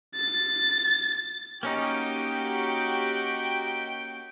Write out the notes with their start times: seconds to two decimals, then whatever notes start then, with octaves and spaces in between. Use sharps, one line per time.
0.16 A6
1.63 A#3 C#4 D#4 F#4 G4 G5